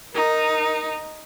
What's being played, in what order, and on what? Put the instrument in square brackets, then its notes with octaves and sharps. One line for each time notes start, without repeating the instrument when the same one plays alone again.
[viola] D#4 [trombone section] A#4